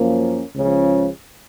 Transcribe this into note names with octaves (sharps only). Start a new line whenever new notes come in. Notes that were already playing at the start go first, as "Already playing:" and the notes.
Already playing: F#2 F3 A#3 C#4
C#2 C#3 F3